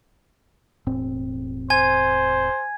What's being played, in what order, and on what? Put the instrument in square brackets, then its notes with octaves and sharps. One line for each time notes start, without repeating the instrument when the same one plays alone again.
[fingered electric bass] E1 A2 C4
[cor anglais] C5 [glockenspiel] G#5 G#6